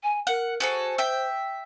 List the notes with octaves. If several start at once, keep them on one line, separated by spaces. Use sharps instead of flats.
G#5
A#4 F#5
F#4 G#4 A4 C5
E5 G5